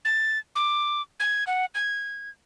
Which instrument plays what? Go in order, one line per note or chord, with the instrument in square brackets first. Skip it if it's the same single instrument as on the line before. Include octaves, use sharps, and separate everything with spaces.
[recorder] A6
D6
G#6
F#5
G#6